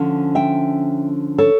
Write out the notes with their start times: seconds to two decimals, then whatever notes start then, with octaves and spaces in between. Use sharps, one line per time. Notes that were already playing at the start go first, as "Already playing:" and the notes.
Already playing: D3 F3 C#4
0.35 E5 G5
1.38 A4 C#5